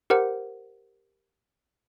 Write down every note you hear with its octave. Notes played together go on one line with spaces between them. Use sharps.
G4 A#4 C5 F#5